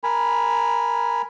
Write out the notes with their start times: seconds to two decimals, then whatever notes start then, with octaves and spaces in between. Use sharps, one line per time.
0.04 A#4 G#5 B5